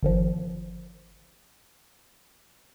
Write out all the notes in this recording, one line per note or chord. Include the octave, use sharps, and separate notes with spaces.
G1 D#3 F3